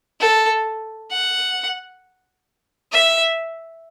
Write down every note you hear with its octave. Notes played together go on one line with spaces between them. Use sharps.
A4
F#5
E5